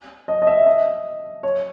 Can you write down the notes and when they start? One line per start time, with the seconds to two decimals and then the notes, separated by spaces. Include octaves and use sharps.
0.28 D#5
0.42 D#5
0.47 E5
0.66 D#5
1.43 C#5